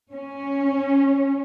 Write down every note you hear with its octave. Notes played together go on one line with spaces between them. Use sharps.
C#4